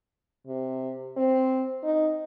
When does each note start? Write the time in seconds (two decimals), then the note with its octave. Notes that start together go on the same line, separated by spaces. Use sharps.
0.47 C3
1.17 C4
1.83 D#4